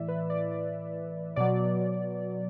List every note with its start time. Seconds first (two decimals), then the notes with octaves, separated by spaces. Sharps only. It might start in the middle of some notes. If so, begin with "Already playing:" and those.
Already playing: A2 E3 D5 E5
0.08 B4
0.30 D5
0.51 D5
1.36 B2 F#3 D5